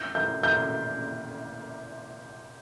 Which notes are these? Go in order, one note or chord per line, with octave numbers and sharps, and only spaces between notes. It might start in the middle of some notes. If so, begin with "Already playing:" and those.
Already playing: G6
G6
G6